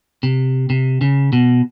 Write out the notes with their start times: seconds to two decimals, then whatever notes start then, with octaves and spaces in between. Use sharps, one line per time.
0.23 C3
0.70 C3
1.01 C#3
1.33 B2